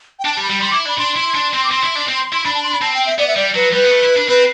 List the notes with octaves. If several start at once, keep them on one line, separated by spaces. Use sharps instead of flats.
G5
D4 A5
G3 A5
B5
G3
G3 C6
E4 D6
D4 B5
D4 C6
E4 C6
D4
C4
D6
C4 C6
E4
D4
C4
E4
D4 B5
A5
C6
B5
C4 A5
G5
E5
B3 D5
E5
G3 D5
F#3 B4
G3 B4
B3
A3
E4
D4
C4 B4